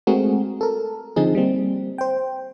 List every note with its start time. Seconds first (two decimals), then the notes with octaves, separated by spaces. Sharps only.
0.07 G#3 A3 C4 F#4 G#4 A#4
0.61 A4 A#4
1.16 D3 F3 C4 D#4 G#4
1.35 G3 A#3 C4
1.98 C5 G5